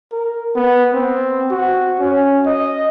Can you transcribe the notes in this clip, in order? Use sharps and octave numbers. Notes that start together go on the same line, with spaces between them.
A#4
B3
C4
F#4
C#4
D#5